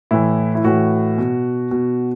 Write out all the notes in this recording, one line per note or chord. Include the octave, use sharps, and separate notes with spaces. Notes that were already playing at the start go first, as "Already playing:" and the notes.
A2 E3 E4
E4
A2 E3 F#4
B2
B2